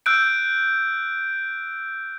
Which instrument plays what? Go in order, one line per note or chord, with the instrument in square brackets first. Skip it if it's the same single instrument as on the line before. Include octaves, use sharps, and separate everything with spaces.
[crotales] E6 F#6 G6 D7